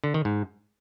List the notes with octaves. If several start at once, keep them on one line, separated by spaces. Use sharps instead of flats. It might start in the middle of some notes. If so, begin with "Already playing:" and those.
D3
D#3
G#2